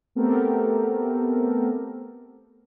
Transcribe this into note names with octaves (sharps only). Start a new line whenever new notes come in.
A3 B3 C4 G4 A4 A#4